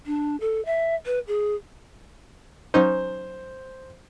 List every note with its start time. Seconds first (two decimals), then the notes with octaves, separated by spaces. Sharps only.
0.06 D4
0.41 A4
0.65 E5
1.06 B4
1.27 G#4
2.74 F#3 C#4 D#4 C5